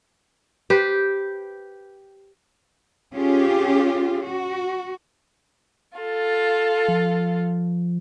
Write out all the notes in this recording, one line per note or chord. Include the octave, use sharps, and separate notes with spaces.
G4 B4 C5
C#4 F4 G4 G#4
F#4
F4 A4
F3